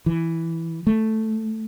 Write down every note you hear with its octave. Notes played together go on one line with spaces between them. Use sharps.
E3
A3